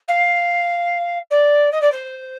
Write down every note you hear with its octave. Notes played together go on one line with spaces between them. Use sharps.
F5
D5
D#5
D5
C5